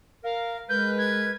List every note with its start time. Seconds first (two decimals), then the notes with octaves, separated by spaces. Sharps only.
0.24 A#4 F5
0.69 G#3 A#4 B4 G6
0.98 G#6